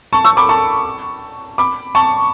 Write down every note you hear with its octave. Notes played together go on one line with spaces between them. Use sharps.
A5 C#6
C#6 E6
B5 D6
A5 C#6
B5 D6
A5 C#6